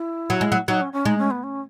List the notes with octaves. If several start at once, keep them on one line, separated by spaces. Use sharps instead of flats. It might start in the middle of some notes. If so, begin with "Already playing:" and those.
Already playing: E4
F#3
G#3
F#3
F#3 D#4
C#4
C#4
G#3 D#4
C#4
B3
C#4